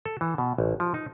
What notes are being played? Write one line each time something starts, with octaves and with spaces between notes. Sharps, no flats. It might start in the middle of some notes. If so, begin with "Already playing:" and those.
A4
E3
B2
A1
F3
D#4